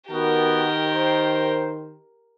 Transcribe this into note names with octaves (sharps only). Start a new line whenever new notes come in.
D#3 B3 F#4 G4 A#4
C5 A#5